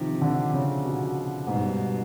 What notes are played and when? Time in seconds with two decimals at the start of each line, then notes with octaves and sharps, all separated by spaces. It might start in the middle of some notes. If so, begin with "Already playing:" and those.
Already playing: C3 D#3 F3
0.21 D3
0.53 C#3
0.85 B2
1.47 G#2 B2
1.54 G2
1.63 G#2